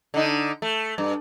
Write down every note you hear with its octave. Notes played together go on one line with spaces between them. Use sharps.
D3 D#4
A3
G2